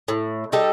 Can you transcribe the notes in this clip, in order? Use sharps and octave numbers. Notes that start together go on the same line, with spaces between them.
A2
G3 D#4 A4